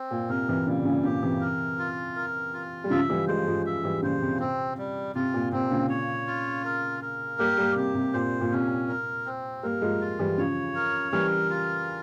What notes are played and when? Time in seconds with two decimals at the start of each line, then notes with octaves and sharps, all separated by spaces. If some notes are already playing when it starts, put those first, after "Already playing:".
Already playing: C4
0.11 A#2
0.29 C3 A#4
0.49 C3 E3
0.66 A#2 C#3 G3
0.85 A#2 C#3
1.04 A#2 C#3 G4
1.23 C3 E3
1.41 A#4
1.79 F4
2.16 A#4
2.54 F4
2.84 G3
2.90 C#3 F3 E5
3.09 E3 G3
3.28 F3 G#3 C5
3.46 F3 G#3
3.66 E5
3.84 E3 G3
4.02 A#2 C#3 C5
4.21 C3
4.40 C3 C4
4.78 G3
5.15 C3 F4
5.34 A#2
5.52 C3 C4
5.71 A#2 C#3
5.89 C#5
6.27 F4
6.65 A#4
7.02 A#4
7.39 G3 A#3 G4
7.58 G3 A#3
7.76 C3 G4
7.95 C3
8.13 A#2 C5
8.41 A#2
8.51 C3 C#4
8.88 A#4
9.26 C4
9.63 G3 A#3 A#4
9.82 F3 G#3
10.01 F4
10.19 E3 G3
10.37 C#3 F3 C#5
10.75 A#4
11.12 E3 G3 A#4
11.50 F4